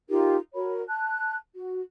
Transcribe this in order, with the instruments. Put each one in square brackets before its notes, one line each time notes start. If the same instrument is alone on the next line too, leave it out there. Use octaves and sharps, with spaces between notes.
[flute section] D#4 F4 G4 A#4
F#4 A#4 C#5 B5
A5 F#6
F#4